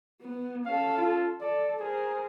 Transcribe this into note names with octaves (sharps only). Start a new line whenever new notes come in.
B3
C#4 A4 F5
F4
A4 D5
G#4 A#4 C5